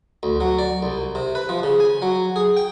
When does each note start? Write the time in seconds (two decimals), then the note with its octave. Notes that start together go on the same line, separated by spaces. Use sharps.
0.23 D2
0.40 F#3
0.59 D5
0.83 C2
1.15 C3
1.35 B4
1.49 F3
1.63 C#3
1.80 G#5
2.02 F#3
2.36 G#4
2.57 G5